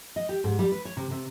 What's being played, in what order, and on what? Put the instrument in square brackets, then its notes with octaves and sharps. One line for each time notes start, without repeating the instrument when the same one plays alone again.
[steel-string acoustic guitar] D#5
G4
G#2
G3
B4
C#5
C3
C3